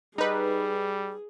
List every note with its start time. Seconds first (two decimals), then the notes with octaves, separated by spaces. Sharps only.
0.18 G3 D#4 G#4 B4